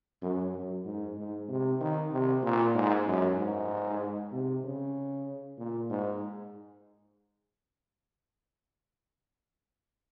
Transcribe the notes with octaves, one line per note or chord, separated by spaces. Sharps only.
F#2
F#2
G#2
G#2
C3
D#3
C3
A#2
G#2
F#2
G#2
C3
C#3
A#2
G#2